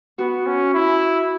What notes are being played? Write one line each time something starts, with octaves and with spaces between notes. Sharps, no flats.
B3 F#4
C#4
E4